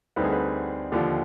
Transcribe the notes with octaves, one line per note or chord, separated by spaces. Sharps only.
D2 D3 G3 C4 D#4 B4
G#4
B4
D#2 D3 F3 G4